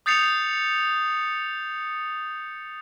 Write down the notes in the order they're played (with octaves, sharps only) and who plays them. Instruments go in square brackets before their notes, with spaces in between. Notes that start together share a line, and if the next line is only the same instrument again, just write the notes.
[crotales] D#6 G6 A6 C7 C#7 F7